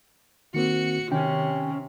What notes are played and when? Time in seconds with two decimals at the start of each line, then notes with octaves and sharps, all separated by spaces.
0.54 D#3 A#3 C4 F#4 C#7
1.12 C3 D#3 C#4 G5